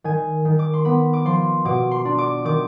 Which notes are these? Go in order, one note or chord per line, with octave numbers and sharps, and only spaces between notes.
D#3 G#5
D#3
D6
C6
B3 B5
D6
F3 C6
B2 D6
C6
D4
D6
D#3 D6